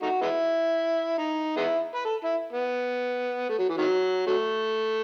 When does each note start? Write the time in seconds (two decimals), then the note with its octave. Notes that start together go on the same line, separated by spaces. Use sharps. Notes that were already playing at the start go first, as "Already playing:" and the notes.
0.02 A3 D#4 F#4
0.21 G#3 B3 E4
1.18 D#4
1.57 G#3 B3 E4
1.95 B4
2.05 A4
2.24 E4
2.53 B3
3.49 A3
3.59 F#3
3.69 E3
3.78 D#3 F#3
4.27 F#3 A3